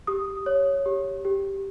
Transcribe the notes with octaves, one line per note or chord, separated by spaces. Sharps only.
G4 D#6
C#5
G4
G4